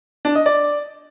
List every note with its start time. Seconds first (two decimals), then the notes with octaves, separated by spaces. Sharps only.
0.25 D4
0.35 D#5
0.46 D5